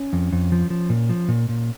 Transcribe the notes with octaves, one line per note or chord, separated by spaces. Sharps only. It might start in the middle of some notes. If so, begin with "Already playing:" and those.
Already playing: C#4
F2
F2
F3
F3
A#2
F3
A#2
A#2